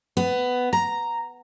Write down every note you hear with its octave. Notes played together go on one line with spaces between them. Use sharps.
B3
A#5